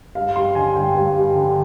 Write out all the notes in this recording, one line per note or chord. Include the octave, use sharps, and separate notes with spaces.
G2 F5
G3 C6
D3 G#5
G2 G5
G2
G3
D3